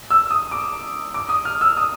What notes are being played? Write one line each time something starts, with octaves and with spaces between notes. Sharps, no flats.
E6
D#6
D6
D6
D#6
F6
E6
D#6